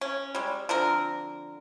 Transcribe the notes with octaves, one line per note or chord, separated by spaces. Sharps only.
C#4
G3 G#3
D3 F3 C4 A#4